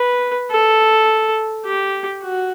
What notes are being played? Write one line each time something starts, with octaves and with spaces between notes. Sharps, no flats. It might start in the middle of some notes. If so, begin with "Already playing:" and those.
Already playing: B4
A4
G4
F#4